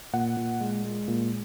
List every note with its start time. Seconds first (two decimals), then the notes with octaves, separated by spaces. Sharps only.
0.13 A#2 F#5
0.37 A#2
0.61 G#3
0.84 G#3
1.08 A#2